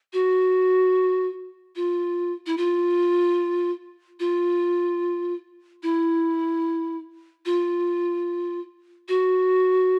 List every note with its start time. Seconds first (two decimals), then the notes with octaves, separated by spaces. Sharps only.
0.13 F#4
1.76 F4
2.46 E4
2.57 F4
4.20 F4
5.83 E4
7.45 F4
9.08 F#4